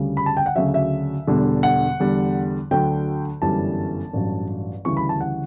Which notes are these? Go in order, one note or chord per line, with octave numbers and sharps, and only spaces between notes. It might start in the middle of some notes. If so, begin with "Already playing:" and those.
Already playing: D2 C#3 G3
B5
A5
G5
F#5
D2 C#3 F#3 E5
E5
E1 E2 D3 G3
F#5
E2 D3 G3
D2 D3 F#3 G5
G1 F#2 E3 G3 A5
A1 G2 F#3
D2 C#3 E3 G3 C#6
B5
A5
F#5